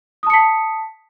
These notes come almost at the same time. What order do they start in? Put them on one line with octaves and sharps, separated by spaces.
D#6 A5 C#7 B6